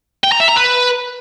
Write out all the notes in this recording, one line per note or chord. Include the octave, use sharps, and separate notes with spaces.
G5
A#5
E5
A#5
B4